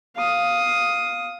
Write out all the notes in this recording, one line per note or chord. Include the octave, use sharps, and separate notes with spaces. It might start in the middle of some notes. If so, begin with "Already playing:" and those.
F5 D#6